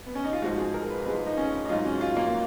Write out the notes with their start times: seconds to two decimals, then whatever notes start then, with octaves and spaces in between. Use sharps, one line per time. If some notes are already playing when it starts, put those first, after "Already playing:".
0.06 B3
0.15 C#4
0.24 D#4
0.33 F4
0.42 G#2 F3 G#3 F#4
0.58 G#4
0.74 A#4
0.90 B4
1.06 G#2 F3 G#3 B4
1.26 D#4
1.37 C#4
1.65 D#4
1.69 G#2 F#3 F4
1.85 C#4
2.01 F4
2.16 A#3